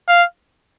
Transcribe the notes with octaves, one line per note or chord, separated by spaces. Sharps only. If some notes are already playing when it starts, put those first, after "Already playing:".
F5